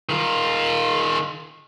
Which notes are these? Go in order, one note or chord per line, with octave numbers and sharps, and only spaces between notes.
D#3 F4